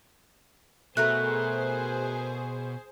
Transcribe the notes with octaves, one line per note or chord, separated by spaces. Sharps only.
B2 A3 F#4 G#4 A#4 C5 F#6